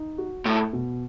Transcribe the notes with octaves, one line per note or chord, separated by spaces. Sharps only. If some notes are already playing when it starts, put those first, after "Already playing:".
Already playing: D#4
F#4
A2 A3
B2